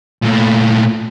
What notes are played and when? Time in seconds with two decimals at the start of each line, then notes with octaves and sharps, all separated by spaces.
0.22 A#2 A3